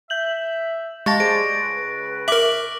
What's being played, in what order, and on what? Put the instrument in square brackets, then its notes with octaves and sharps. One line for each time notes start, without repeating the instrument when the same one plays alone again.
[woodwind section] E5 [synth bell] G6 F#7
[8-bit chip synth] G#3 [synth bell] G4 F5 A5 [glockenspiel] C#6 A6 A#6
[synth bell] G#4 [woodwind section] C5 D5 [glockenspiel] D7
[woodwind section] C#2 B4
[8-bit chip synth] A#4 E5 [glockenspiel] D6 F#7